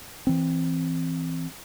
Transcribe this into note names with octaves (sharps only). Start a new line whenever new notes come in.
E3 C4